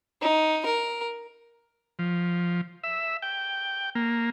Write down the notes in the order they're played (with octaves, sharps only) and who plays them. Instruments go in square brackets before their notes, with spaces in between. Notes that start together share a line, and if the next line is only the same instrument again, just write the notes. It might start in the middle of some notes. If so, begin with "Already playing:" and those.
[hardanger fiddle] D#4
A#4
[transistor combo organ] F3
E5
G5
A#3